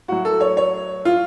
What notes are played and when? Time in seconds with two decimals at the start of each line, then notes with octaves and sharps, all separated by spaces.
0.08 A2 F#3 F#4
0.25 A4
0.41 C#5
0.57 C#5
1.05 F4